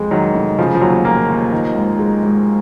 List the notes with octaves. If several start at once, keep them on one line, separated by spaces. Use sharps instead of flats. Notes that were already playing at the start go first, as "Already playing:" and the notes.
Already playing: F2 G#3
D#3 F#3
F1
C#3 F3
F3
D#2 F#3
F3 A#3
D#2
D#3
G#2
G#3
G#2